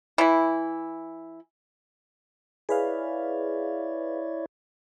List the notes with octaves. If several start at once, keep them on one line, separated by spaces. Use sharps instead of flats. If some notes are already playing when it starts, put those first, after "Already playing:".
E3 E4
E4 G#4 B4 C#5 D5 F5